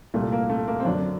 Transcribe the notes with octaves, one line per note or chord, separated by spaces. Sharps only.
C2 A#2 G3 A3
A#3
A3
A#3
C4
F#2 D3 F#3 D4